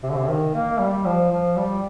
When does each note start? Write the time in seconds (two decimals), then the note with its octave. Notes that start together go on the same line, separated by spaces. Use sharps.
0.03 C3
0.09 D3
0.18 C3
0.28 D#3
0.54 A#3
0.79 G3
1.05 F3
1.31 F3
1.56 G3